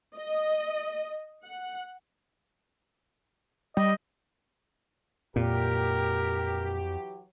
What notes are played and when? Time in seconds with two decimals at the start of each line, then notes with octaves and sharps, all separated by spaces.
0.16 D#5
1.45 F#5
3.77 G3 D#5
5.36 F2 A#2 E3 F#3 G4 A#4